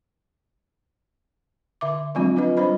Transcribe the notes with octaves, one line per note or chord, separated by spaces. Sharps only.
D3 E5 D6
F3 F#3 G#3 C4 D4 F4
D4 F4 B4 D#5
G3 D4 F4 C5 D#5 B5